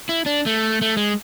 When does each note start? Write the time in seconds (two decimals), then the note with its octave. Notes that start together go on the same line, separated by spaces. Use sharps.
0.09 E4
0.26 D4
0.46 A3
0.82 A3
0.97 G#3